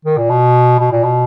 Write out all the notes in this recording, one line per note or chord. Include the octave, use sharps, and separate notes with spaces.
D#3
A#2
B2
B2
A#2
B2